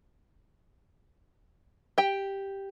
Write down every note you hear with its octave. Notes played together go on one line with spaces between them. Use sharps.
G4 G5